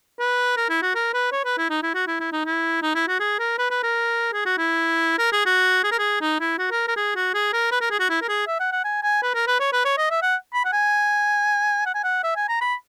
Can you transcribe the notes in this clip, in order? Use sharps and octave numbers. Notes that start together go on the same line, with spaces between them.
B4
A#4
E4
F#4
A#4
B4
C#5
B4
E4
D#4
E4
F#4
E4
E4
D#4
E4
D#4
E4
F#4
G#4
A#4
B4
B4
A#4
G#4
F#4
E4
A#4
G#4
F#4
G#4
A#4
G#4
D#4
E4
F#4
A#4
A#4
G#4
F#4
G#4
A#4
B4
A#4
G#4
F#4
E4
A#4
G#4
E5
F#5
F#5
G#5
G#5
B4
A#4
B4
C#5
B4
C#5
D#5
E5
F#5
B5
F#5
G#5
F#5
G#5
F#5
E5
G#5
A#5
B5